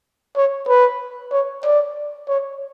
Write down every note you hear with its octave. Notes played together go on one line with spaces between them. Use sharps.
C#5
B4
C#5
D5
C#5